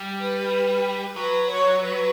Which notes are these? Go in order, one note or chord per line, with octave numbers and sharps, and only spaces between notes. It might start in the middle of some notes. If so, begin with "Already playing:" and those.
Already playing: G3
B4
F#3 B4
C#5
B4